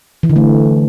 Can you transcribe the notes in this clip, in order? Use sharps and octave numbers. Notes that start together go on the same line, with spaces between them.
E3
D3
A3